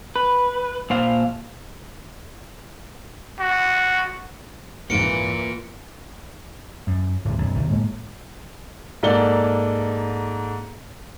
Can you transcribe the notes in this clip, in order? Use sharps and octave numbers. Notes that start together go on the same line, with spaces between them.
B4
A#2 C5 F5
F#4
C2 F2 G#2 E3 A#3 F4 C#7 D7
F#2
D1 G#2
B1 F#2
E1 B1 D3 D#3
A2 G#3 A#3
G#2 A#3 A4 D5 G7